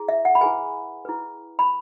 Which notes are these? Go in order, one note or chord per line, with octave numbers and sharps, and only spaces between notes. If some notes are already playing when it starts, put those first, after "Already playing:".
Already playing: E4 G#4
E5
F#5
B5
E4 G#4 B4 G#5
E4 G#4 B4
B5